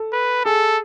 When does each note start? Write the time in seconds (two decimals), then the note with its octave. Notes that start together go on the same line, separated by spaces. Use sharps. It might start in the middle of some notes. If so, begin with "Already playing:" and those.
Already playing: A4
0.13 B4
0.44 G#4 A4